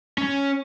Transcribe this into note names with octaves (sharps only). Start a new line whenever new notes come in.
C#4